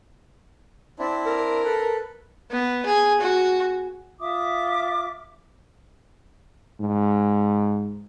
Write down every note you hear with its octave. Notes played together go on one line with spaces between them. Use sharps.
C4 D4 E4
A#4
A4 B4
B3
G#4
F#4
F4 E5 D6 D#6
G#2